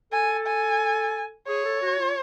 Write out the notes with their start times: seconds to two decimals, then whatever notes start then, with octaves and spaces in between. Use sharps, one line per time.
0.12 A4 G#5
0.47 G#5
1.48 G#4 C#5
1.65 A4
1.82 F#4
1.99 F4